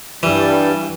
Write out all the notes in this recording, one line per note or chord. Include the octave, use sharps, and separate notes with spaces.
G2 E3 G3